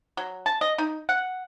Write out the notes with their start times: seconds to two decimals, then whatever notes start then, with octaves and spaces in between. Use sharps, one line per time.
0.17 F#3
0.46 A5
0.61 D#5
0.78 D#4
1.09 F#5